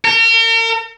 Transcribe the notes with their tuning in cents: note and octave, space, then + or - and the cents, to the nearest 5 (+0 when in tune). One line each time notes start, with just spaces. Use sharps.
A#4 -40